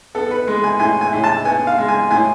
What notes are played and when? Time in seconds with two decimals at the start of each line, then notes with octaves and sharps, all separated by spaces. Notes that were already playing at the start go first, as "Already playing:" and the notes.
0.15 B3 A4
0.31 B4
0.48 G#3
0.64 G#5
0.79 A2 G#5
1.01 G#5
1.13 A2
1.24 A5
1.45 B3 G#5
1.67 F5
1.78 G#3
1.88 G#5
2.11 A2 G#5